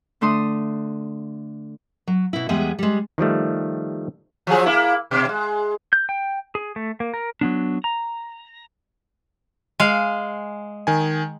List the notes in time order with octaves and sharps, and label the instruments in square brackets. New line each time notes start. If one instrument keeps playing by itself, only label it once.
[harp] D3 A3 D4 C6 D#6
[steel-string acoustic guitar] F#3
B2 E4
E2 G3 G#3 B3 G#4 E5
G3 G#3
[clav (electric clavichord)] D#3 F3 G3 A3
[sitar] F3 F#3 G#4
A#3 E4
B2
G#3
[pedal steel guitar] G6
G5
G#4
A3
A#3
A#4
[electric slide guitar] F#3 B3 D4
A#5
[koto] G#3 F5
[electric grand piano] D#3 G#5